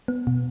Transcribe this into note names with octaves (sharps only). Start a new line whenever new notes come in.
B3
B2